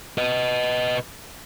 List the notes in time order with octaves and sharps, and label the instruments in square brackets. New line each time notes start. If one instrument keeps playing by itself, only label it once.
[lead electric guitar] B4 D#5